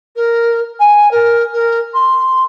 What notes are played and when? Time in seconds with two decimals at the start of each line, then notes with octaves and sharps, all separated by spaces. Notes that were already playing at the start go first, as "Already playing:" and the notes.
0.15 A#4
0.79 G#5
1.11 A#4
1.53 A#4
1.94 C6